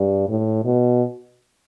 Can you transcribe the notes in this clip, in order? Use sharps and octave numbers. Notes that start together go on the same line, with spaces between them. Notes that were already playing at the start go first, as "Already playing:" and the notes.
Already playing: G2
A2
B2